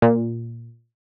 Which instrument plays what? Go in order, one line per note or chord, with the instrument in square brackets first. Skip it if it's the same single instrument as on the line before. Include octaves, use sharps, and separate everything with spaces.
[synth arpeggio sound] A#2